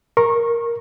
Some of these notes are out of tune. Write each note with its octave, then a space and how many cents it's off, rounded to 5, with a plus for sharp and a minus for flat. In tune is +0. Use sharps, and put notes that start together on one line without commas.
A#4 +0 C#6 -25